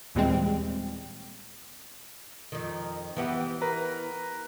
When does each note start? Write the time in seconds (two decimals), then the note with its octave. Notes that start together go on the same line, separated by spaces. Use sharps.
0.15 D#2 A#2 E3 G3 G#3 C4
2.52 F2 D#3
3.17 E3 B3 G4
3.61 A#4 B4 A#5